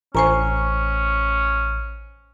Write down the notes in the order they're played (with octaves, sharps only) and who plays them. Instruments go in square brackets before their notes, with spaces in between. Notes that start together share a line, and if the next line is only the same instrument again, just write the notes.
[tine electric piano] A1 C#6 [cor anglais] C#4 [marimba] C5 G#5 A#5